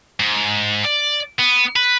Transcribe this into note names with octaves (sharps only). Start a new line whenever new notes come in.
G#2
D5
B3
B4